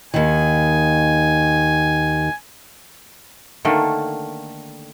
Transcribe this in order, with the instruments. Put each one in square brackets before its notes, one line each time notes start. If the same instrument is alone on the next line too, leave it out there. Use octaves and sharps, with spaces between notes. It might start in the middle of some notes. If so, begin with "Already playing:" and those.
[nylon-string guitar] D#2 D#3 [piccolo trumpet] G#5
[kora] D3 D#3 A3 A#3